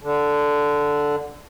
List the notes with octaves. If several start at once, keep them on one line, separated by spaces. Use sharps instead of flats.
D3